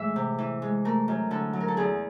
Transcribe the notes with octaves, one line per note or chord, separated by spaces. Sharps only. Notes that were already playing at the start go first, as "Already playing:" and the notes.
Already playing: A2 E3 G#3 E5
C3
E3
G#3
A3 A#4
F#2
D3 A4
F#3
A#4
A4
E2 G#4